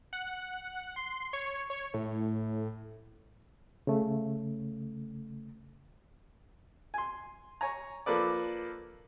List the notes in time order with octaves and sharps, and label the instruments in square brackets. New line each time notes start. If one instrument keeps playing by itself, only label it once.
[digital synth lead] F#5
C6
C#5
C#5
A2
[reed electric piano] C#3 A3
[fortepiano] G#5 C6
C#5 G#5 A#5
F3 A#3 A4 B4 D5